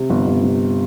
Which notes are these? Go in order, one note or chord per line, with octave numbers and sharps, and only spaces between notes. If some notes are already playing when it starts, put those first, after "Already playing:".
Already playing: C3
G1
G1
C3